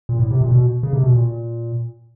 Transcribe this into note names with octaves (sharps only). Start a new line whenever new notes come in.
A#2
A2
C3
A#2
B2
C#3
C3
B2
A#2